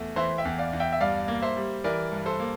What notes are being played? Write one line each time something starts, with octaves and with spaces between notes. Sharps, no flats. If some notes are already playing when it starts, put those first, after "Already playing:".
Already playing: E2 A3
E3 C5 E5
E5 G5
E2
D5 F5
E2
E5 G5
E5
G2 D5 F5
A#3
C5 E5
G3
E3 A#4 D5
G2
A4 C5
A#3